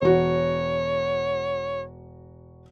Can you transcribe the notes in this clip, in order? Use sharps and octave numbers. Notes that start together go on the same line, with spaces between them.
E1 F#4 C#5